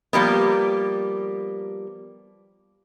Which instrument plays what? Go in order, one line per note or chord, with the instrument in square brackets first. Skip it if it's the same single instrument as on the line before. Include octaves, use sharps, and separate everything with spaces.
[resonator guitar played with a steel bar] F3 G3 A#3 B3